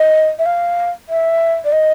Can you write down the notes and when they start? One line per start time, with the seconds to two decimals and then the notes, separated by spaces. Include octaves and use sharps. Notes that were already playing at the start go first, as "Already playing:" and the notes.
Already playing: D#5
0.39 E5
0.46 F5
1.09 E5
1.65 D5
1.72 D#5